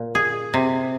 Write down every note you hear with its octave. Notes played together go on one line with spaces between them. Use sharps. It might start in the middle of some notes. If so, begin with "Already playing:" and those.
Already playing: A#2
G#4
C3